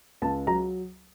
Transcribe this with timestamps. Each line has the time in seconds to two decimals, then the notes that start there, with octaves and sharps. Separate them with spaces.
0.22 C#2 A5
0.47 F#3 A#5